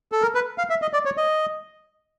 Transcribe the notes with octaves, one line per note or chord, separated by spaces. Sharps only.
A4
A#4
B4
F5
E5
D#5
D5
C#5
D#5